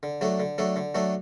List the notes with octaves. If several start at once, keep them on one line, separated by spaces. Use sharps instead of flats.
D3
F#3 A3 D4 A4
D3
F#3 A3 D4 A4
D3
F#3 A3 D4 A4